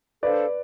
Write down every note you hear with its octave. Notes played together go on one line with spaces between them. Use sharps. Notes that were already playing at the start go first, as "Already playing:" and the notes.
D4 A4 B4 C5 D5 F5